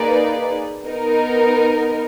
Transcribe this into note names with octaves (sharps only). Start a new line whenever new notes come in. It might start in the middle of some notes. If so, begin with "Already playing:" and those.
Already playing: A#3 D#4 G#4 B4 D5
B3 D#4 A#4